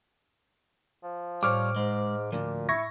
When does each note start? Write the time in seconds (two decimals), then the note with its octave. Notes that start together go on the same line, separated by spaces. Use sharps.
1.03 F3
1.43 A2 G3 C5 C#5 D6 F6
1.76 G#2 G#3
2.32 D2 A#2 F3
2.69 E4 C#6 G#6 A#6